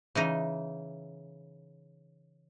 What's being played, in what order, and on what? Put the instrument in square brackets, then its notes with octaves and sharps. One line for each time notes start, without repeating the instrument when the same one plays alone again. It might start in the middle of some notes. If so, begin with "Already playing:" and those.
[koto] C#3 E3 D#4